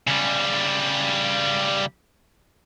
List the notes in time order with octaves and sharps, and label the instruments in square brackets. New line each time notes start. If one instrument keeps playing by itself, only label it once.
[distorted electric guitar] C#3 G3